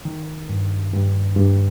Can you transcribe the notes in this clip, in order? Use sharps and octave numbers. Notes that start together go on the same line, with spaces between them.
D#3
G2
G2
G2